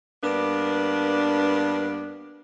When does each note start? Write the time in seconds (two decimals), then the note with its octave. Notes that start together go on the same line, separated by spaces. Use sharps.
0.23 G2 A#3 B3 D4